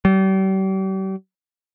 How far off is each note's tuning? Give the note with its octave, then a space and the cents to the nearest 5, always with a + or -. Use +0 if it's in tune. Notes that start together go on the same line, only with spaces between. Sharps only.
G3 -40